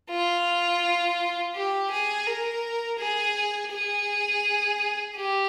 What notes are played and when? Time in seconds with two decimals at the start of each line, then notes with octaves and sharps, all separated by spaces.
0.10 F4
1.55 G4
1.91 G#4
2.27 A#4
2.99 G#4
3.72 G#4
5.16 G4